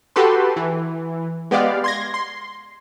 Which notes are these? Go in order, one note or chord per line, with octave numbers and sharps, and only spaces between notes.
F#4 G4 A4 B4 C6
E3
G#3 B3 G4 D5 F5
C6 G#6 A#6
C6